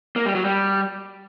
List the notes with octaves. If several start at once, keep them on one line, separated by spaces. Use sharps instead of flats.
A#3
G3
F#3
G3